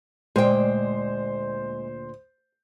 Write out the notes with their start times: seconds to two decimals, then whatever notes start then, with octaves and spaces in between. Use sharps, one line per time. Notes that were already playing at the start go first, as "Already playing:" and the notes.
0.36 D2 A#2 G#3 C5 G5